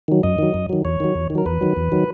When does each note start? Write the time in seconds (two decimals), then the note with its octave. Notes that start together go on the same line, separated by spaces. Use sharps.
0.08 D#3 F#3
0.23 F#2 D#5
0.38 D#3 F#3
0.54 F#2
0.69 D#3 F#3
0.85 E2 C#5
1.00 D#3 F#3
1.15 E2
1.30 D#3
1.35 F#3 A#4
1.46 E2 B4
1.61 D#3 F#3
1.76 E2
1.92 D#3 F#3